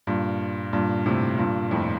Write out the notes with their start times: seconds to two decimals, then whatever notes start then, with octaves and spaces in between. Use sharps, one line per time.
0.07 G2 A#2
0.73 G2 A#2
1.06 A2 C3
1.38 G2 A#2
1.71 F2 A2